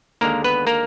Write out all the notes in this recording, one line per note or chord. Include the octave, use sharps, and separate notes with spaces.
D#2 D3 G#3 A#3 A#4
B3 B4
A#3 A#4